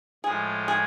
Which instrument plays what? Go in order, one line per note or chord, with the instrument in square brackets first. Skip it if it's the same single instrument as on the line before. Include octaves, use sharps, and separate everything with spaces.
[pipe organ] A2 F3 G#3 [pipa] G#4
[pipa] G#4